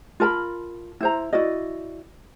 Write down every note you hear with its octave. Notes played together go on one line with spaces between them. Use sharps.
F4 A#4 A5 B5
E4 C5 A#5
E4 F#4 D5 D#5